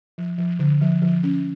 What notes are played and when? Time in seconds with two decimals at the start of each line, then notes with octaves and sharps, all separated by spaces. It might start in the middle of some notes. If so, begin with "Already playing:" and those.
0.18 F3
0.38 F3
0.59 D3
0.81 F3
1.02 F3
1.23 C#4